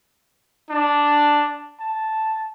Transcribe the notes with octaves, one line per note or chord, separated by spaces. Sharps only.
D4
A5